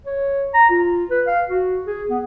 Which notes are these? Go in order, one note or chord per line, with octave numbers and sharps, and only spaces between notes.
C#5
A#5
F4
B4
F5
F#4
G#4
B3